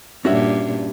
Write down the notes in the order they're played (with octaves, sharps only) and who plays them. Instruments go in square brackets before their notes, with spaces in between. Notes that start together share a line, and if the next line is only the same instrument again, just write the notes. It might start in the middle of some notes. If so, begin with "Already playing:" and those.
[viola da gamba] G2 A#2 [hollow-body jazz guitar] C#4 F#4 E5